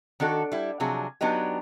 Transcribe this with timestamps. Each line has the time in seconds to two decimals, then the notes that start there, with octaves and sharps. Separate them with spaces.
0.20 D#3 D4 F#4 A4
0.52 G3 E4
0.80 C3 F3 F#3 D4 G#4
1.21 F#3 B3 D4 D#4 G4